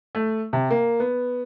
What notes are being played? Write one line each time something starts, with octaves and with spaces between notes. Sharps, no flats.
A3
C3
A#3
B3